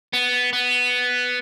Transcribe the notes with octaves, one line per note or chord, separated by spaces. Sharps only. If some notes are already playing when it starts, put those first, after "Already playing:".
B3
B3